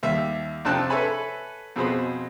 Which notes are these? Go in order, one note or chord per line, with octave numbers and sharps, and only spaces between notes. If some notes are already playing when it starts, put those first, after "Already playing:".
D#2 G3 E5
F2 C3 D4 G5 A5 F#6
A4 B4 C#5 E5 G#5 B5
F2 B2 G#4 C5 B5